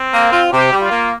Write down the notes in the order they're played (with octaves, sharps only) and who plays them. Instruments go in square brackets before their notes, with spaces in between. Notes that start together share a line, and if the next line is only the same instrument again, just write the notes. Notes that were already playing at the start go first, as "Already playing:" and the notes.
Already playing: [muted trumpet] C4
[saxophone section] A#3
F4
[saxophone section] C3 [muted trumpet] G4
[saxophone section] G3
[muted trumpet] F4
[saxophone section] A#3